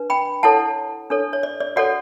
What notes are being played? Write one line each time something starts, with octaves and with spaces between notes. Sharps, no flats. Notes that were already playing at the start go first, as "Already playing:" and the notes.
Already playing: D4 B4
G5 B5
E4 A4 C#5 F#5 A5
D4 A4 C#5
C#5
D5
D5
F#4 A4 C#5 D5 F#5